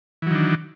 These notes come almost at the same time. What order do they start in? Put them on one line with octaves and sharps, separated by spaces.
E3 F#3 D#3 D4